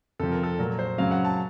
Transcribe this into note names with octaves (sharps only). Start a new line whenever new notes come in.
F2 C3 F3 A4
A#4
A4
A#2 F#3 A#4
C5
F#2 C#3 F#3 F5
F#5
A5